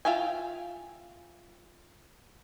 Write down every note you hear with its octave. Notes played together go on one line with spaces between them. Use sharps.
F4 E5 F5 G5 G#5